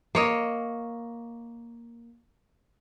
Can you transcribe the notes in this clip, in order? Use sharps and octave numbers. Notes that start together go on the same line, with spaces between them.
A#3 C#5 D#5